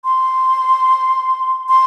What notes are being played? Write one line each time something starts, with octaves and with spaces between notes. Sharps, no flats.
C6
C6